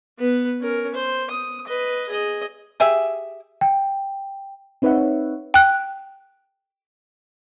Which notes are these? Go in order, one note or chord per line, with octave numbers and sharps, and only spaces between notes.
B3 B4
C#4 A#4
C5
D#6
B4 D#5
G#4 D#5
G4 G#4 E5
G5
C4 D#4 B4 C#5 E5 F#5
G5 F#6